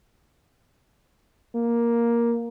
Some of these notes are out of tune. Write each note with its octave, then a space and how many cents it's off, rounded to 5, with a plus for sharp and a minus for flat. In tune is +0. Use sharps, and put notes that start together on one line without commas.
A#3 +10